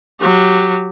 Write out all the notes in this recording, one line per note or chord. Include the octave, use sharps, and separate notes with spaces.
F#3 G4